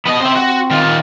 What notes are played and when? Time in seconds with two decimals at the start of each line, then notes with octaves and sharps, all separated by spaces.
0.07 B3 D#5
0.21 C4 C5 E5
0.35 F#4
0.71 D#3 F4